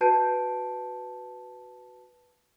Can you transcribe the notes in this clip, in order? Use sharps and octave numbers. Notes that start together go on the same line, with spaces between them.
F#4 B4 A5 G6 C7 D7